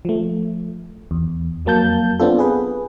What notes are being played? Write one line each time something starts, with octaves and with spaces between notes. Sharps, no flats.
F3 A3
E2
F2 F#3 A#3 A5 G6
B3 C4 D4 F4 A4
G#4 B4